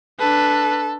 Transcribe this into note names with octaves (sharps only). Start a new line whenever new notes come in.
D4 A4 B4